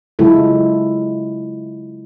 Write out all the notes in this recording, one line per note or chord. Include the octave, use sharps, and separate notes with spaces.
C#3 F#3 G#3 E4 F4 A4